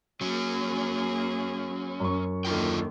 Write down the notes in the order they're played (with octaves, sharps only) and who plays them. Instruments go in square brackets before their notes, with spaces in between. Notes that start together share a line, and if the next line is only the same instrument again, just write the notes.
[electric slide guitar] F#3 C#4 [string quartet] A#3 G#4
[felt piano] F#2 C#6
[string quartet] D#2 D3 D#3 [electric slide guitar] F4 A#4 G5